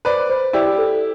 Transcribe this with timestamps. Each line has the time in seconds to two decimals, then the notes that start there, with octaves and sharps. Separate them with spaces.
0.05 B4 C5 D5
0.29 C5
0.53 E4 G4 D5
0.78 A4